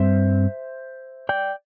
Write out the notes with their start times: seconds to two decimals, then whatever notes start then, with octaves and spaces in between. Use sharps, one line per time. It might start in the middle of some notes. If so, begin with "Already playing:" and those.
Already playing: G2 G3 C4 C5 E5
1.29 D5 G5